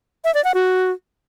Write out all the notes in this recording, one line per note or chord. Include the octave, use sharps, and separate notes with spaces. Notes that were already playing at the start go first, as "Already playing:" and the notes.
E5
D5
F#5
F#4